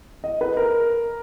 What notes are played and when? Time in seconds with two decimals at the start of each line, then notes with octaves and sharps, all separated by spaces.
0.24 D#5
0.41 B4
0.57 A#4